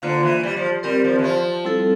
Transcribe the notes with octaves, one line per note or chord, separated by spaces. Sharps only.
D3 A#3 F4 C5 F5
E3
G3
F3
G3 C4 G4 A#4 D5
F3
E3
F3
G3 C4 E4 A4